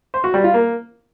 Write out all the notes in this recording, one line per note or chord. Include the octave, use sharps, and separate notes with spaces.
C5
F#4
G3
F4
A#3